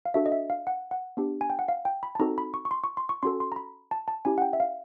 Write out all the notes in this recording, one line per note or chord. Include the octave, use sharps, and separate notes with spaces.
F5
D4 F#4 A4 E5
D#5
E5
F5
F#5
F#5
B3 D4 G4
G#5
G5
F#5
F5
G5
B5
A5
C4 D#4 F#4 A4 A#5
B5
C#6
C#6
C6
C#6
C6
C#6
C#4 F#4 A4 C6
C6
A#5
B5
A5
A5
C#4 E4 G4 G#5
F#5
G5
E5
F5